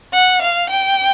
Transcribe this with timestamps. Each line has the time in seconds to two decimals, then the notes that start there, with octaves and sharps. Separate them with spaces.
0.13 F#5
0.41 F5
0.69 G5